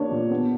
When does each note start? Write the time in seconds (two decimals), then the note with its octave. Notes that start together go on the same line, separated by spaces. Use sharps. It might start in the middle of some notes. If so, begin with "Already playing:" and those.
Already playing: A#3 D4 G4 C#5
0.11 A#2
0.30 B3